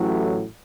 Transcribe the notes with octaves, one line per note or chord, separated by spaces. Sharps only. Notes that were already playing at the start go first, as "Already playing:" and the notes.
Already playing: A1 A2 F#3